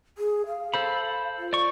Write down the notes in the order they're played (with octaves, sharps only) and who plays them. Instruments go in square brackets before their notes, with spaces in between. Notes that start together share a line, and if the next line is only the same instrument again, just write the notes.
[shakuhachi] G#4
F5
[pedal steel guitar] A4 C5 B5
[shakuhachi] F4
[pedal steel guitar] D5 C#6